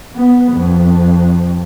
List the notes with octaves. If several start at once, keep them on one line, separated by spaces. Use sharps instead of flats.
B3
F2